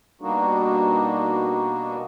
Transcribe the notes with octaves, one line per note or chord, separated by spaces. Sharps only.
B2 G3 A#3 D4 D#4 F#4